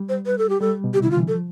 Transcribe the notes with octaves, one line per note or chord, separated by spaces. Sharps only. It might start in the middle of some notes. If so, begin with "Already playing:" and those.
Already playing: G3
C5
B4
A4
G4
G3 A4
B2
C3 G4
E4
D3 F4
E3
F3 A4